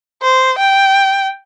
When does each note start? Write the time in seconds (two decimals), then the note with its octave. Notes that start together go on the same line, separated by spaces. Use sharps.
0.22 C5
0.58 G5